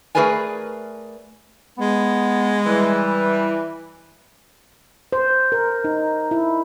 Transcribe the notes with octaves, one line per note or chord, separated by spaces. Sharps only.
A3 G#4 A#4 B4 D5 G#5
G#3 B3
E3 G3
C5
A#4
D#4
E4